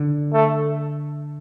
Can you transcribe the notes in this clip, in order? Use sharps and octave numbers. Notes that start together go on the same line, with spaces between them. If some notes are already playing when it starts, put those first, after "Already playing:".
Already playing: D3
A3